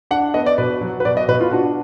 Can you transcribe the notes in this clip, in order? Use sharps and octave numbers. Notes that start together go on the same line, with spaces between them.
D4 F#5
B3 D#5
D5
B2 B4
F#3
B4
B2 D5
D#5
B2 B4
F4
D4 F#4